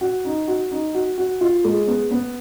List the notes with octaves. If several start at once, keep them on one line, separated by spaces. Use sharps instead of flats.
F#4
D#4
F#4
D#4
F#4
F#4
F4
G#3
B3
B3